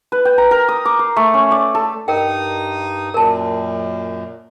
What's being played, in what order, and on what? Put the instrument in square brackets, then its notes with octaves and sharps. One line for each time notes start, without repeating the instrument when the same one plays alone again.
[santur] B4
G5
A#5
A#4
D#6
D6
C6
A3
C#4
D5
A4
[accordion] G2 D#4 D#6 [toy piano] A#4 G5
[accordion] F#2 A#2 [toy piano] A#4 A5